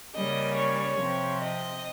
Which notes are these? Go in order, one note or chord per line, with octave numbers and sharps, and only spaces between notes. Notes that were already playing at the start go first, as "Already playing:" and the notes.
C#3 G3 A#3 C#4 D#5
C#5
C3 F3 C4
D#5